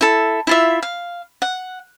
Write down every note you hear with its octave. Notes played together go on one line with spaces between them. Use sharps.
E4 A4
E4 F4 E5
F5
F#5